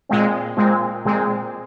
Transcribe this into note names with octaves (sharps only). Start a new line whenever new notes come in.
A#2 G#3 C4
A#2 G#3 C4
A#2 G#3 C4